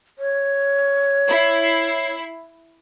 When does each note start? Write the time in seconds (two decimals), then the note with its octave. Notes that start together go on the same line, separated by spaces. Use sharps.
0.19 C#5
1.29 E4 C7